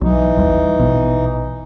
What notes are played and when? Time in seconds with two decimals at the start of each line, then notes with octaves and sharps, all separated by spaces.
0.01 B1 E3 F#3 D#4
0.37 G#1 D#2 G3
0.79 A#1 B2